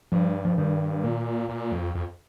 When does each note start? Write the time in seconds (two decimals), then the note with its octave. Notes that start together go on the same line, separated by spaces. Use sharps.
0.12 G2 F3
0.45 F3
0.57 G2 D#3
1.04 A#2
1.49 A#2
1.72 F2
1.95 F2